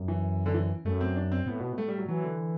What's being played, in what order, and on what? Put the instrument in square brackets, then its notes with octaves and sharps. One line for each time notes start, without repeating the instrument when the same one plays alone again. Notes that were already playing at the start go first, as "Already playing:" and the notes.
Already playing: [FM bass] F#2
[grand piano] E3
D3
E3
[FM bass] F#2 [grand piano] A3
[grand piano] C4
D4
C4
[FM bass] A2 [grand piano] B3
[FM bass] B2
A2
[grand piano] A3
G3
F#3
[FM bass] E3 [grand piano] F#3
[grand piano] D3